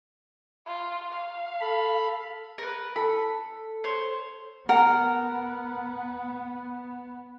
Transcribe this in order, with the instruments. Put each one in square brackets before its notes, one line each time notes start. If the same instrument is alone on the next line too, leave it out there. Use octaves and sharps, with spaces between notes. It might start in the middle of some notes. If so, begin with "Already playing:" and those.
[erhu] F4
F5
[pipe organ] A4 B5
[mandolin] A#4 B4
[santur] A4 [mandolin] B5
[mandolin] C5 C#5
[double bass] B3 [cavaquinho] A#4 [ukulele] F#5